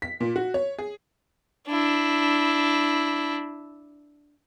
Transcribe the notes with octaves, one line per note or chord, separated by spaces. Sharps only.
B6
A#2
F#4
C#5
G#4
D4 E4